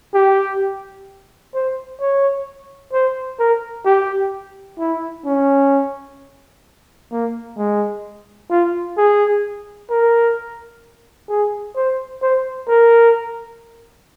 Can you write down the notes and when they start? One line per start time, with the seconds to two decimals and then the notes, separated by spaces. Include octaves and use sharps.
0.14 G4
1.54 C5
2.00 C#5
2.93 C5
3.39 A#4
3.86 G4
4.79 E4
5.26 C#4
7.12 A#3
7.57 G#3
8.50 F4
8.97 G#4
9.90 A#4
11.29 G#4
11.76 C5
12.22 C5
12.69 A#4